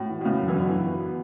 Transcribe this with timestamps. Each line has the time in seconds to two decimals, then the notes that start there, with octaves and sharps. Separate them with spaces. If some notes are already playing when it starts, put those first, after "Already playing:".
Already playing: A2 F#4
0.09 E3
0.21 B2
0.25 A2 C#3 B3
0.40 F#2
0.48 E3
0.55 B2 D3 F#4
0.71 E3
0.86 B3